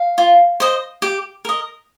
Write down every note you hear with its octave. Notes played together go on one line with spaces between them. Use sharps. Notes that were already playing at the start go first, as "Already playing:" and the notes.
Already playing: F5
F4
C5 D#5
G4
A#4 D#5